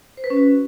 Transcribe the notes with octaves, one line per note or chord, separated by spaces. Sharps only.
C5
B4
C#4
F#4